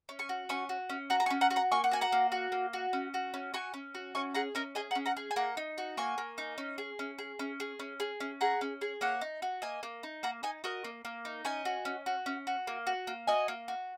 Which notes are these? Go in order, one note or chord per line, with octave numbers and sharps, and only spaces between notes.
C#4
G#5 C#6
F#4
C#4 G#5 C#6
F#4
C#4
F#4 F#5 A#5
A#5
G#5 C#6
C#4
F#5 A#5
F#4 C#6
F#5 A#5
A#3 G#5 C#6
F#5
F#4 G#5
F#5 A#5
A#3
F#4
A#3
F#4
C#4
F#4
C#4
F#4 G#5 C#6
C#4
F#4
C#4 G#5 C#6
G#4 F#5 A#5
C#4 A#4 D#5
G#4 D#5 G#5
F#5 A#5
C#4
F#5 A#5
G#4
G#5
A#3 F#5 A#5
D#4
F#4
A#3 G#5 C#6
A#3
D#4
C#4
G#4
C#4
G#4
C#4
G#4
C#4
G#4
C#4
G#4 F#5 A#5
C#4
G#4
A#3 C#5 F#5
D#4
F#4
A#3 D#5 G#5
A#3
D#4
A#3 F#5 A#5
D#4 D#5 G#5
F#4 A#4 D#5
A#3
A#3
D#4
C#4 D#5 G#5
F#4
C#4
F#4
C#4
F#4
A#3
F#4
A#3
F#4 D#5 G#5
A#3
F#4